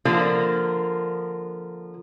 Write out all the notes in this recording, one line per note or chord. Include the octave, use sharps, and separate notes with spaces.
D3 F3 A#3